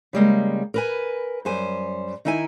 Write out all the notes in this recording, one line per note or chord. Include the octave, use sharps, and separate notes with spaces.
C#3 G3 G#3 A#3
A#4 B4 G#5
F#2 G3 C5 G#5
D#3 D#4 E4 E5 G#5